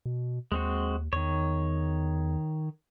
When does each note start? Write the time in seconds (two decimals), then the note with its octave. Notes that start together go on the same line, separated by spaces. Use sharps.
0.06 B2
0.52 D#2 G#3 C4 F#4
1.13 E2 D#3 C#5